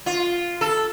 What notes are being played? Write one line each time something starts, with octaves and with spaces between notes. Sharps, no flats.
F4
A4